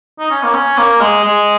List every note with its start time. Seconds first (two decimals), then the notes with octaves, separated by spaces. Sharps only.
0.19 D#4
0.31 C#4
0.43 A#3
0.54 C#4
0.78 A#3
1.01 G#3
1.24 G#3